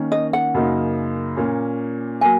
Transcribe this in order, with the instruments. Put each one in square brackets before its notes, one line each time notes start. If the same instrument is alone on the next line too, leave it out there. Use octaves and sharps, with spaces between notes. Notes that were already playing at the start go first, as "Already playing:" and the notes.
Already playing: [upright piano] D#3 A#3 C#4
[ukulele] D#5
F#5
[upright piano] F#2 C#3 A#3 D#4
A#2 A#3 C#4
[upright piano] F#3 A#3 [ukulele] G#5